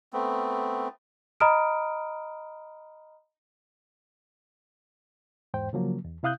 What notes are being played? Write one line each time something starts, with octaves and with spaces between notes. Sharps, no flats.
A3 B3 C4
D#5 A#5 B5 D#6 F6 D7
E2 G#2 C5 G5
C#3 F3 F#3 A#3
E2
C3 E4 F5 D#6 F#6 G6